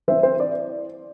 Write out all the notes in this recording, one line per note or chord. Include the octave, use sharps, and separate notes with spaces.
E3 C4 C5 E5
C5
D5